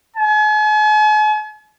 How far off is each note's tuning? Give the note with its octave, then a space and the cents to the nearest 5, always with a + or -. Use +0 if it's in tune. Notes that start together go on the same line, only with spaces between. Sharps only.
G#5 +45